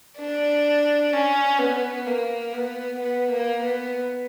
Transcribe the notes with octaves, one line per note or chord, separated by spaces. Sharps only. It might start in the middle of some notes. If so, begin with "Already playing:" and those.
D4
C#4
B3
A#3
B3
B3
A#3
B3